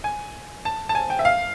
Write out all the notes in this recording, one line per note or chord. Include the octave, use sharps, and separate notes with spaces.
G#5
A5
A5
G#5
G5
E5
F5